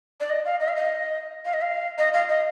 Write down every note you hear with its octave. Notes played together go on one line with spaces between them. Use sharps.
D5
D#5
F5
D#5
F5
D#5
F5
D#5
F5
D#5
F5
D#5